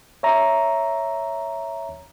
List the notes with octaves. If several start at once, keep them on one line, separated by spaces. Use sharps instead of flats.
C#5 E5 A#5